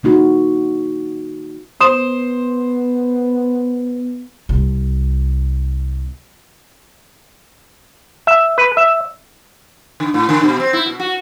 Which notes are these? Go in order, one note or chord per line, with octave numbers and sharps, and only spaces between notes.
D#3 A#3 D#4 F#4
B3 C5 D#6 E7
C2 C3
E5
B4
E5
D3
A2
D3
B2
C4
E4
B2
F#4